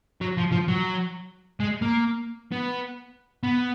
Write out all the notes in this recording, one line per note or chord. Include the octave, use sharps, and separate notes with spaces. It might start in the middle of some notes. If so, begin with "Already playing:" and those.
F#3
F3
F3
F#3
G#3
A#3
B3
B3